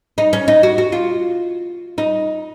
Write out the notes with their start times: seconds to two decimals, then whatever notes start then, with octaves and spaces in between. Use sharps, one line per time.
0.18 D#4
0.33 C#4
0.48 D#4
0.63 F#4
0.78 F#4
0.92 F4
1.98 D#4